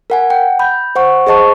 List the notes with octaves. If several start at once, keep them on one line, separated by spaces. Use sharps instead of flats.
A#4 F#5 G#5
F#5 G5
B5 G6
C5 F#5 C#6
G#4 C5 D#5 A5 C#6